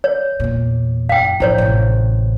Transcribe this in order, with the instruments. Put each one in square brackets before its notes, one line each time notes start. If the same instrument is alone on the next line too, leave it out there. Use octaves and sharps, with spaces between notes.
[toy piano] C#5
[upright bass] E2 A#2
[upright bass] F#1 [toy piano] F5 G5
[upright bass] A1 F3 [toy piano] E4 C5 C#5
[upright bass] A1 C3